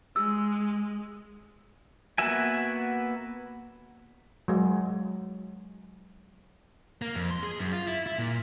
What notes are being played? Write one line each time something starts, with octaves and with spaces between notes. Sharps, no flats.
G#3 E6
A#3 B3 F#4 E5 G#5
F#3 G#3
A#3
F2
C6
G#4
F#2
F4
E4
E4
A#2